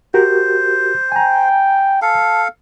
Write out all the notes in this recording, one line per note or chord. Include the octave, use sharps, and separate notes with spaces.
F#4 G4 A#4 C5
G5 G#5 A#5
A4 F5 A5